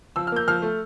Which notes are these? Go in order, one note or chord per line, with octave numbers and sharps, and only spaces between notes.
F3 E6
F6
A#3 G6
F3 F6
A3